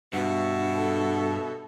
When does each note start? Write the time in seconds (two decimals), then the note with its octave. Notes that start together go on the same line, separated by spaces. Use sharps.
0.13 G2 B2 E5 F#5
0.77 A4